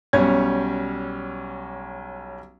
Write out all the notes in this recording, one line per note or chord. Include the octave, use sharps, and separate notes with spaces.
B1 G3 C#4 C#5 G#6